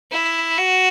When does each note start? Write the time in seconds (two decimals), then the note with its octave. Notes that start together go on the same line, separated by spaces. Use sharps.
0.11 E4
0.57 F#4